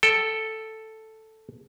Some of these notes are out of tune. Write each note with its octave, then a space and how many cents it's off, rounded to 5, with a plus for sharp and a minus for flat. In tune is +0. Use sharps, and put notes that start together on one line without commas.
A4 +0 G5 +0